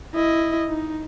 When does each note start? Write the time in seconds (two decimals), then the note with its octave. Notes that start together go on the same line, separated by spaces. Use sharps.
0.14 E4 D#5
0.68 D#4